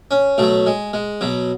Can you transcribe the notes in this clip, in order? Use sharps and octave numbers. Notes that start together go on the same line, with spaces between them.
C#4
B2 F#3 A3
G#3
G#3
B2 F#3